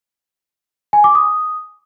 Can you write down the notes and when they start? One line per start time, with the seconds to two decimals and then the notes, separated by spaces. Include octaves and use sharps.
0.93 G#5
1.04 D6
1.15 D#6